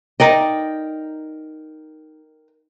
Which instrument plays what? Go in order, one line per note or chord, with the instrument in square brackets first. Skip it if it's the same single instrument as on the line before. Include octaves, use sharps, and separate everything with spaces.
[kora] D#4 D5 D#5 [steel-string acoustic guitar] A#4 G5